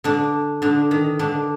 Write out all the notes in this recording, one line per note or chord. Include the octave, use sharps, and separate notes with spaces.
D3 D4
D3 D4
D#3
D3 D4